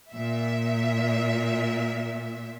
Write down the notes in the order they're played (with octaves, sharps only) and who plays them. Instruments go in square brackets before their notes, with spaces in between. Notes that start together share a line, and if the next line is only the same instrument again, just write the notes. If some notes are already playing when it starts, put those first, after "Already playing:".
[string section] A#2 E5